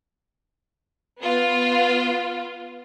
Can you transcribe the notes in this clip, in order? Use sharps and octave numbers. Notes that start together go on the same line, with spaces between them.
B3 F4